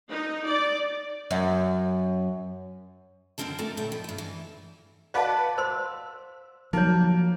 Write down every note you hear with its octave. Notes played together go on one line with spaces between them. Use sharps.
D#4
D5
F#2
F#2 D3 A#3 C4 A#4 A5
A3 A4 A#4 A#5
A#2 E4 C#5 G5
F3
G2 E4
E3
F#4 B4 D5 D#5 F5 A5
C5 C6 E6
F3 F#3 A#3 D#4 C#5